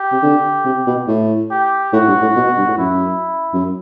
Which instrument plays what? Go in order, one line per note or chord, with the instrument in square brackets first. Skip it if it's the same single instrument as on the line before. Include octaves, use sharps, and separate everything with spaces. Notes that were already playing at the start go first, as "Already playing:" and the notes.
Already playing: [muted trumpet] G4
[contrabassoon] C3
D3
C3
B2
A2
[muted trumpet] G4
[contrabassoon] A2 [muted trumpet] F#4
[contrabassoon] G2
A2
B2
B2
G2
A2
[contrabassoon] F#2 [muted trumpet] E4
[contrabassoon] F#2